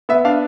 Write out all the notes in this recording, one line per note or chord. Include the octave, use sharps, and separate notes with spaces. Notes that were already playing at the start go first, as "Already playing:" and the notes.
B3 E5
D4 F5